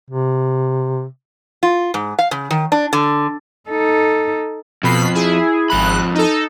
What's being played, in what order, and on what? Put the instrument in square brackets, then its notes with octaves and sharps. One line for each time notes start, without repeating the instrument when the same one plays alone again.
[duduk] C3
[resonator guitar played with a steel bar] F4
G#2
F5
C#3
D#3
D4
D3
[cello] D#4 A4
[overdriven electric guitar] F2 [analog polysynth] B2 B5 C7
[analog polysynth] E4 G#4
[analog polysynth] G#1 F#6 [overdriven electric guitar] F2 B5
[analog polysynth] D#4 A4